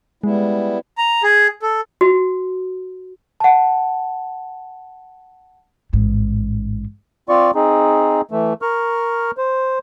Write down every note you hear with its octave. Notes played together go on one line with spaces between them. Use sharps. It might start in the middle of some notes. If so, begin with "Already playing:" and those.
G3 G#3 B3 E4
A#5
G#4
A4
F#4
F#5 A5
A1 G#2
C4 F4 D5 C#6
C4 D#4 G#4
E3 A3
A#4 C#6 F6
C5